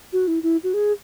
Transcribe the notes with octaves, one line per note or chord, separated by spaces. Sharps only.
F#4
E4
E4
F#4
G#4